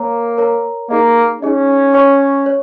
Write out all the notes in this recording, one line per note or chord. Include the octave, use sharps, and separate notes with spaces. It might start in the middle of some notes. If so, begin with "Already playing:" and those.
Already playing: A#3 A#4 C#5 A#5
A#4 C#5 A#5
A#3 D#4 G#4 D#5
C#4 D#4 G#4 D#5
C#5 G#5 C#6
C#5